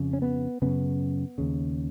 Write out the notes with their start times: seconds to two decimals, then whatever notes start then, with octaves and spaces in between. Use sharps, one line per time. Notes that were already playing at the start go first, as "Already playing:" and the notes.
Already playing: F2 C#3
0.13 C#4
0.22 B3
0.62 F#2 C#3 B3
1.38 D#2 C#3